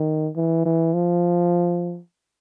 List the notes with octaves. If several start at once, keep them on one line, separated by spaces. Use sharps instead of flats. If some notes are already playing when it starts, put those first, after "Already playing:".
Already playing: D#3
E3
E3
F3